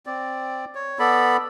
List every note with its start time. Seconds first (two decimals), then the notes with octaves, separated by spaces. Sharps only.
0.06 C4 D5
0.75 C#5
0.99 B3 A4 D5 B5